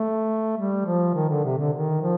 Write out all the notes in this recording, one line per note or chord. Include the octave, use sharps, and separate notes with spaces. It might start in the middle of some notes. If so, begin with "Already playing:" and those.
Already playing: A3
G3
F3
D#3
D3
C3
D3
D#3
F3